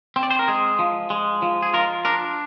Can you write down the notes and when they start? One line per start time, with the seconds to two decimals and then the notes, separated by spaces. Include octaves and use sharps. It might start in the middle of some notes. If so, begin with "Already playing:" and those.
0.16 C4
0.23 D5
0.30 C5
0.39 A#4
0.48 G#3 G#4
0.79 F3
1.10 G#3
1.42 F3
1.63 G#4
1.74 F4 A#4
2.05 D4 A#4